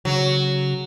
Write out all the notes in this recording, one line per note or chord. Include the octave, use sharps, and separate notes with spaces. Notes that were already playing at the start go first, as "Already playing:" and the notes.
C#3 F#3